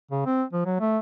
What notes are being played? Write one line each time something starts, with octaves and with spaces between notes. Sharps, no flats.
C#3
C4
F3
F#3
A3